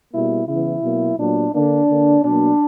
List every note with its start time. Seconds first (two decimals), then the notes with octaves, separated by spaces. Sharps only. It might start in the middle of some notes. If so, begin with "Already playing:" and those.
0.13 B2 G3 A#3 E4
0.48 C#3 E3 B3 E4
0.83 B2 F#3 A#3
1.18 A#2 F#3 B3 D4
1.53 D3 A#3 D4
1.89 D3 A#3
2.24 B2 F#3 A#3 D4